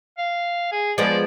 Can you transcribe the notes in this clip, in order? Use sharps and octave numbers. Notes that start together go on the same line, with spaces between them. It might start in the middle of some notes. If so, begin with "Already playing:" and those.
F5
G#4
F3 G#3 B3 D5